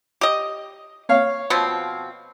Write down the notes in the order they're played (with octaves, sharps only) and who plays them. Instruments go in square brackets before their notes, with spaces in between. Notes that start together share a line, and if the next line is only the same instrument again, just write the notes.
[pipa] G4 D#5
[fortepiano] C#5 F5
[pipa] B2 F3 C4